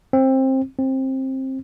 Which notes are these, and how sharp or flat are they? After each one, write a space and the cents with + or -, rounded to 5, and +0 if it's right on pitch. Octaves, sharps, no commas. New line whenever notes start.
C4 +20
C4 +20